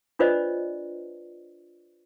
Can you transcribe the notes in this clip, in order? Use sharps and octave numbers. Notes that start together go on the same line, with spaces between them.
D4 F4 B4 C5 D5 D#5